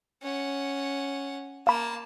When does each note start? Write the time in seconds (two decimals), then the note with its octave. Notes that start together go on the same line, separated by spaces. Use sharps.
0.22 C#4 F#5
1.67 A#3 F5 A5 B5